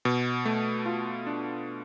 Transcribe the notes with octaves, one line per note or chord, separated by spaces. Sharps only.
B2
A3
F4
D4